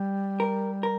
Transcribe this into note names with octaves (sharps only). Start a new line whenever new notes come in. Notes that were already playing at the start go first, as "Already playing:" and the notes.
Already playing: G3
A#4
A#4